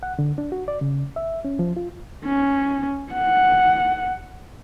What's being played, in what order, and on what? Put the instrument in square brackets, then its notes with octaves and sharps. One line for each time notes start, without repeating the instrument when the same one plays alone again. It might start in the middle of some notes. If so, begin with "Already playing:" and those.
[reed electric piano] F#5
D3
D4
F#4
D5
C#3
E5
C#4
F3
F4
[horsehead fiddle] C#4
F#5